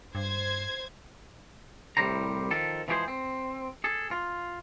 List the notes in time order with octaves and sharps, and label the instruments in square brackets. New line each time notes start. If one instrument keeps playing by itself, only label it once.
[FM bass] G2 [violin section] C5 G#6
[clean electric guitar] C2 F#2 A2 G3 C5 A#5
D#3 F3 A4
E3 F3 G#3 G4 G#4 C5
C4
G#4 A4
F4